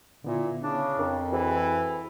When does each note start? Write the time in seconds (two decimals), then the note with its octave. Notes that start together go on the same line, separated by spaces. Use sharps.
0.24 A#2 D3 B3 E4
0.63 C#3 D4
0.99 F2 A#4
1.32 E3 F#4 G#4 C5